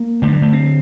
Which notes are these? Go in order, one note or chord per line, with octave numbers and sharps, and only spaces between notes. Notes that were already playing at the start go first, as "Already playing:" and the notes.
Already playing: A#3
G2 D3 A3
F#3
A3
C4